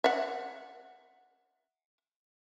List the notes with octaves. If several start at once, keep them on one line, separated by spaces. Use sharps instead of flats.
E5 F#5